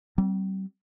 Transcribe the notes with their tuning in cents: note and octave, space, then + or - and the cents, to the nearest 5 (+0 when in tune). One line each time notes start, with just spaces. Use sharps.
G3 -35 C4 +0